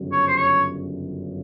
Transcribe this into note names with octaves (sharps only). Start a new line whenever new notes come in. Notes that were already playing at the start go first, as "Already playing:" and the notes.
Already playing: G1 F#2 C#3
C#5
C5
C#5